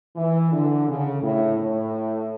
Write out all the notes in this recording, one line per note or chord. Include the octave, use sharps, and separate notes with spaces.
E3
D3
C#3
A2
A2